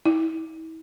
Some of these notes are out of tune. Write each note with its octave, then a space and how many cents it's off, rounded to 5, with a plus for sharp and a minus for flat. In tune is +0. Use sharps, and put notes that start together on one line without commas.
E4 -40